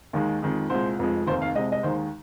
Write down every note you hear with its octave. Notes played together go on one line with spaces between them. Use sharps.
D#2 D#3 G#3
F2 D#3 G#3
C2 A#2 G#3 C5
F1 F2 F3 G#3
F1 D#2 D#3 C5
F5
C2 C3 G#3 D#5
D#5
D#2 D#3 G#3 C5